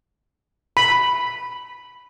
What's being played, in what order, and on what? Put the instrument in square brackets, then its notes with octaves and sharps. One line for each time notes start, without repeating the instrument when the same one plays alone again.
[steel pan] B5